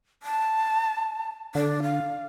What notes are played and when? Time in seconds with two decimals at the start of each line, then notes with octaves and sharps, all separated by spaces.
0.23 A5
1.55 D3 D4
1.83 F5